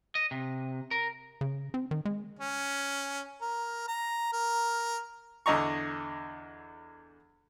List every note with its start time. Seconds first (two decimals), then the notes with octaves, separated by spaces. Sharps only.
0.15 D#5
0.31 C3
0.91 A#4
1.41 C#3
1.74 C4
1.91 D#3
2.05 G#3
2.39 C#4
3.41 A#4
3.88 A#5
4.32 A#4
5.46 E2 D3 D#5 A#5 C#6